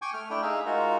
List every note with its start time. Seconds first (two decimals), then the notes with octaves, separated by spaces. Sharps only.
0.02 G5 G#5 C#6 D6
0.14 A3 F6
0.30 A3 D4 E4 G5
0.42 D#4 G#4 E5 F5
0.66 G#3 D#4 F4 F#4 A#4